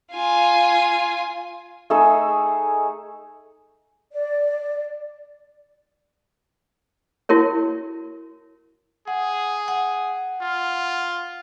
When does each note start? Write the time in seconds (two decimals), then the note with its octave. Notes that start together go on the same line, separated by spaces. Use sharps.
0.12 F4 G#5
1.90 A3 D#4 G#4 E6
4.13 D5
7.29 E4 F#4 A#4 C#5
9.08 G#4 F#5
9.68 F#5
10.42 F4